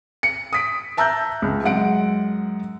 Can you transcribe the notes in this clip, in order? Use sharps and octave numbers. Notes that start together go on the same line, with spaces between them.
C#7
D#6 B6 D7
E5 A5 A#5 E6 F#6 G6
C#2
F#2 G#3 F#5 D7